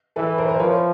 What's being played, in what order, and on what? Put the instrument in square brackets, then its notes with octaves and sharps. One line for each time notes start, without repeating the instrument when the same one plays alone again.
[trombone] E3 [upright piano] A4 B4
[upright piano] A#4 C5
A#4 C5
[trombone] F3 [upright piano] B4 C#5